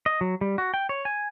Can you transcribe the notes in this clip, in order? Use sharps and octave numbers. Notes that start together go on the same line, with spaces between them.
D#5
F#3
G3
F#4
G5
C#5
G#5